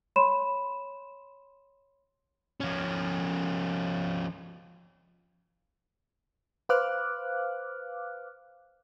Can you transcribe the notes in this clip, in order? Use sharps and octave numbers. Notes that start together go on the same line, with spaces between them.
C#5 B5 C6 E7
F3 C#4
B4 C5 F5 D6 F6 F#6